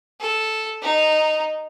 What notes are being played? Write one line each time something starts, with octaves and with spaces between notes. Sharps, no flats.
A4
D#4